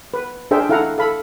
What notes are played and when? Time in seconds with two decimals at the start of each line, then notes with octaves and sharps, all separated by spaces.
0.14 B4
0.51 D4 G#4 A#4 C5 E5 G5
0.69 E4 A4 F5 F#5 A#5
0.98 A4 F5 B5